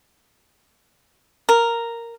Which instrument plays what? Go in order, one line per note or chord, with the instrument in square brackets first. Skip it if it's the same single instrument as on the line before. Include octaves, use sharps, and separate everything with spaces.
[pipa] A#4